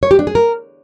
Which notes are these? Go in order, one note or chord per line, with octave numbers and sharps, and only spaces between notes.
C#5
G4
D4
G#4
A#4